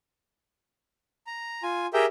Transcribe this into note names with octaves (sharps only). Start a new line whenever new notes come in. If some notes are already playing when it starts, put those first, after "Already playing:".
A#5
F4 G#5
G4 G#4 A#4 E5 G5